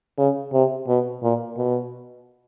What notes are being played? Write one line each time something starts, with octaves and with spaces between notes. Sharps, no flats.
C#3
C3
B2
A#2
B2